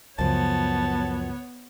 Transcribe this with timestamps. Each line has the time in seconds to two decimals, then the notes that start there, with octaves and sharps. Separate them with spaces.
0.18 C#2 F#2 C#3 F3 B3 C#5 A5